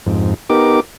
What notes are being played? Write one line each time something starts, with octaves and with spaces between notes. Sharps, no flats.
F2 G#2
B3 D#4 G4 A#4 D6